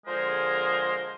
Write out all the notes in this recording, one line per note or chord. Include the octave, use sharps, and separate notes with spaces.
D3 F3 G#3 G#4 A#4 C5